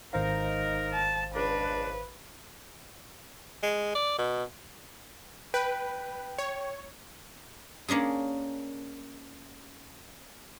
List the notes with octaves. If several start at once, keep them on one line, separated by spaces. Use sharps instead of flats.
G#1 D#4 A#4 C5 F5
A5
C#2 D4 B4
G#3
D5
B2
B4 G5
C#5
A#3 C#4 D4 G#4